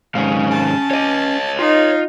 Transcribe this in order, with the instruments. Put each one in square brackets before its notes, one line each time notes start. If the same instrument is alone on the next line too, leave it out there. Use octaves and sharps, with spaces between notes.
[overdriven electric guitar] D#2 G#2 [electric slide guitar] C#4 F5
[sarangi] A5
[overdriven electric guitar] C#5 D#5
[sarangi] D#4 [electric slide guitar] F4